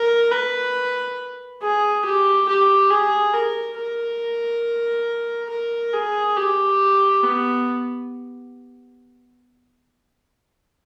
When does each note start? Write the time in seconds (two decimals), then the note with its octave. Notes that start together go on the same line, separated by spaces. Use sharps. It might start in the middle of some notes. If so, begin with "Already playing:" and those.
Already playing: A#4
0.31 B4
1.62 G#4
2.05 G4
2.48 G4
2.90 G#4
3.33 A#4
3.78 A#4
5.50 A#4
5.93 G#4
6.37 G4
7.24 B3